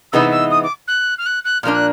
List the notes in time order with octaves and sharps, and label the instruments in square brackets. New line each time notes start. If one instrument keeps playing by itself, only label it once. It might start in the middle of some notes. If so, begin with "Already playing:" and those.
[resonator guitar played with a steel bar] C3 E3 G#3 B3 D#4 [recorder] E6
[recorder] E6
D#6
D6
F#6
F6
F#6
F#6
[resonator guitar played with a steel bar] A#2 F3 A#3 D4 [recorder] F6
[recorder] F#6